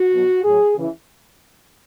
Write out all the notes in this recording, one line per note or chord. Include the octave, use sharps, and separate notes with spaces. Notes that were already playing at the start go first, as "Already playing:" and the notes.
Already playing: F#4
B2 F#3
A2 F#3 G#4
C#3 E3